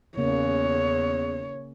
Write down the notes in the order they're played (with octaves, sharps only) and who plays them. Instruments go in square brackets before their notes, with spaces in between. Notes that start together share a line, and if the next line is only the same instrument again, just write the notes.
[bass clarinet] E2 [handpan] C#3 A#3 C#4 [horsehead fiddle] C#5